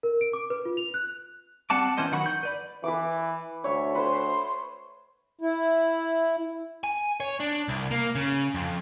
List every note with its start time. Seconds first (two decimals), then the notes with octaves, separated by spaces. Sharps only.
0.03 A#4
0.21 D7
0.33 D6
0.50 B4
0.65 F4
0.77 F7
0.94 F#6
1.70 G3 C4 F#5 A5 D6
1.97 E3 B3 C#4 C5 D#5
2.12 D#3 F#3 F#5 B5 C#6
2.26 G6
2.43 B4 D5 B5
2.84 E3 B4 D6
3.64 D2 C#5 E5
3.95 B4 C5 C6
5.41 E4
6.84 G#5
7.20 C#5
7.40 D4
7.68 C2
7.91 A#3
8.15 C#3
8.54 F2